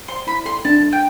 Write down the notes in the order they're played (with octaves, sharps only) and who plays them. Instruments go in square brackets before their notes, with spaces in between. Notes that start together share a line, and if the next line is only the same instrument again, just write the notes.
[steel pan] C5 [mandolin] C6
[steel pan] E4 [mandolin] B5
[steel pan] A4 [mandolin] C6
[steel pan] D4 [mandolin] A5
[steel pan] A4
[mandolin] G5